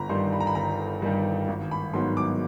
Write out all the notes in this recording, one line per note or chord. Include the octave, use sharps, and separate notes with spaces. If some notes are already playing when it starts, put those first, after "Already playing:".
Already playing: G1 A#5 B5
G2 D#3 G3 C6
B5
A#5
B5
G1 A#5
G2 D#3 G3
G#1
B5
G#2 D#3 F#3 B3 C6
D6